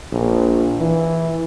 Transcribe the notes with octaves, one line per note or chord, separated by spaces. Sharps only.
A#1
E3